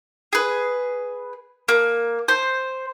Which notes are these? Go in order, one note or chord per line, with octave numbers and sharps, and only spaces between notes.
G#4 B4
A#3
C5